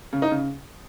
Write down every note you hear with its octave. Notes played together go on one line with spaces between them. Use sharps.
C#3
D#4
C#3